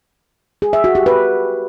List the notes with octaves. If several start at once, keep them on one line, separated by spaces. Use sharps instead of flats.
G#4
E5
F#4
G4
B4